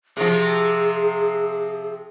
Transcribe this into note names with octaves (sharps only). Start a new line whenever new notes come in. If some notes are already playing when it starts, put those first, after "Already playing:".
C3 F3 G#4